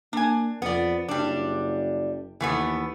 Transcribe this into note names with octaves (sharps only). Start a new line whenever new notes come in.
A#3 D4 G#5
F2 B3 D5
F#1 G3 D4
D#2 E3 A3 B3